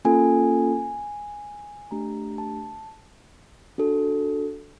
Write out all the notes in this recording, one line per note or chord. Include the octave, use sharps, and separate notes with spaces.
A#3 C#4 F4 A4 G#5
A3 D4 G4 A#5
A5
D4 F#4 A4